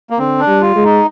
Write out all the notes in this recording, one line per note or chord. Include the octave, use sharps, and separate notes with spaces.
A#3
D3 C4
D4
G3
F4
G#3
D#4